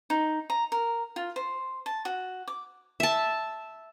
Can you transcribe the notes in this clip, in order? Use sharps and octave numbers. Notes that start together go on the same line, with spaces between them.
D#4
A#5
A#4
F4
C5
A5
F#4
D6
E5 A5